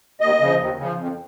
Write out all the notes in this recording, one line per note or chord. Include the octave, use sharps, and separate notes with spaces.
D#2 D#5
C#3 F3
D#2
C#3 F3
F2